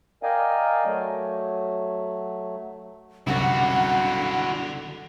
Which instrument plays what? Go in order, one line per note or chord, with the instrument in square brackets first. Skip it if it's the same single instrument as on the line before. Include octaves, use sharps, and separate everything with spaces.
[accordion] A#4 D5 D#5 F5 G5 G#5
F#3 A3
[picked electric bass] C2 F#2 [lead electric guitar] D3 [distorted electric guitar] E4 F#4 [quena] F#5